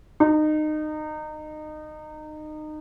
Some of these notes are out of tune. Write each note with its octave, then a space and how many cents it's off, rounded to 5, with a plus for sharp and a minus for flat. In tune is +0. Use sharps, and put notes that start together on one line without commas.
D#4 -25